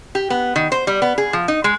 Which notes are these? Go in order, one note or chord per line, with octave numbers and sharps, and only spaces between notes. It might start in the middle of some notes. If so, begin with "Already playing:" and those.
G4
B3
D#3
C5
G3
B3
G#4
F3
D#4
G#3